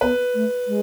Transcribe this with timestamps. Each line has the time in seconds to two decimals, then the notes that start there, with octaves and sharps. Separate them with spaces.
0.01 B3 B4
0.33 A3
0.66 G#3